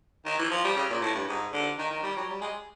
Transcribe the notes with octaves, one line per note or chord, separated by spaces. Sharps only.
D#3
E3
F3
G3
C#3
A#2
A2
G2
G#2
D3
D#3
D#3
G3
F#3
G3
G#3